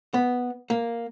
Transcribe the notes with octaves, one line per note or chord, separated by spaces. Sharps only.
B3
A#3